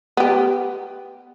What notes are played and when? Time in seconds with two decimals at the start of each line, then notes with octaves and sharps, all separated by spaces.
0.17 B3 G4